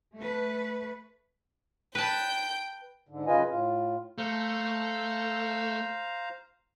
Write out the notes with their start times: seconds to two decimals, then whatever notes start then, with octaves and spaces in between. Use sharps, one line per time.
0.16 A3 B4
1.95 B4 G5 A5 G6
3.09 G#2 D3
3.27 F#2 C#3 F4 B4 D#5 G#5
3.51 A2 F4
4.18 A3 C5 F5 A#5